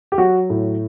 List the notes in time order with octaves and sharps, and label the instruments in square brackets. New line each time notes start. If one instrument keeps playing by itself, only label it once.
[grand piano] G4
F#3 F#4
A2